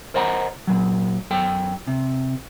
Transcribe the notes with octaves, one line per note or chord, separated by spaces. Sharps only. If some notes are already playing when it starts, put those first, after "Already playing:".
A#4 C5 D#5 F#5 A5 A#5
A#2 F#3
F#2 A4 G5
C3